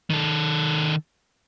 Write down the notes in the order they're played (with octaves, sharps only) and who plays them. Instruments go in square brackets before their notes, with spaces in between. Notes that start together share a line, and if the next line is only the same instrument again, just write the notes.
[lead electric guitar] D#3 A4